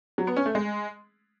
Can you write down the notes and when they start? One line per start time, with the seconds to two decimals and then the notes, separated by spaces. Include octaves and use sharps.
0.18 F#3
0.27 B3
0.37 C#4
0.46 A3
0.55 G#3